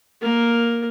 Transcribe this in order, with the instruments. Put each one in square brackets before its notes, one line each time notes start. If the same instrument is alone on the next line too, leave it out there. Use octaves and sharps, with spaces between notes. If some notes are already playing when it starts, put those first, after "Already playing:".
[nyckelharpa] A#3 A#4